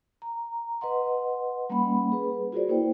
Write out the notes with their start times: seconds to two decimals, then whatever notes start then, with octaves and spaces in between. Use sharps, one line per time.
0.22 A#5
0.81 B4 D#5 F#5 C6
1.70 G3 A#3 C#4 F#5 B5
2.12 G#4 B4
2.52 F4 F#4 G#4 A#4 C5 D5
2.68 A#3 E4 C5 G5